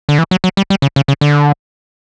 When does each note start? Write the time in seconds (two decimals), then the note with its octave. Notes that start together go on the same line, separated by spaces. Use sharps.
0.09 D3
0.18 E3
0.31 F#3
0.44 F#3
0.57 G3
0.70 G3
0.82 C#3
0.96 C#3
1.08 C#3
1.21 D3